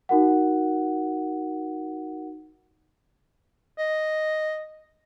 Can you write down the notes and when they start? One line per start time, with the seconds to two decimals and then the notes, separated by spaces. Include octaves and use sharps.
0.09 D#4 F#4 A#4 F#5
3.78 D#5